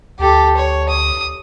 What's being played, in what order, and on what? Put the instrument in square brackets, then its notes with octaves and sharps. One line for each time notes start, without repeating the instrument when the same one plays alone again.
[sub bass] D2 [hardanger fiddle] G4 A4
[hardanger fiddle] C#5
D#6